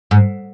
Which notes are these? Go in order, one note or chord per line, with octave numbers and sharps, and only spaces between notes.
G#2